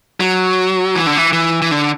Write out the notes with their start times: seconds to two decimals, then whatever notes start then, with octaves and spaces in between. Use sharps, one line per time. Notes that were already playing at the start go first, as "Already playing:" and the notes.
0.20 F#3
0.95 E3
1.07 D3
1.17 E3
1.33 E3
1.62 E3
1.71 D3